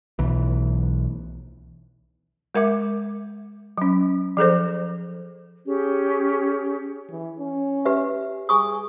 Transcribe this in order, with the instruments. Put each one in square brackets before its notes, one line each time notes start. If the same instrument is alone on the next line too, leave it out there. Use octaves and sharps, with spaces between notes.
[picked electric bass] B1 E3
[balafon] G#3 A#4 E5 D6
F#3 C#4
F3 G#4 A4 C5
[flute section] C#4 G4 G#4
[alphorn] E3
C#4
[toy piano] G4 B4 E5
[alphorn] G#4 [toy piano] G#5 C#6 D#6